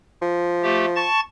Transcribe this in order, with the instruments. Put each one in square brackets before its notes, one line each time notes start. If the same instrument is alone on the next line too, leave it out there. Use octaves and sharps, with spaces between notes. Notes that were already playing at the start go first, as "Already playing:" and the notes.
[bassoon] F3
[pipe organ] A3 G4
A5 C#6 A6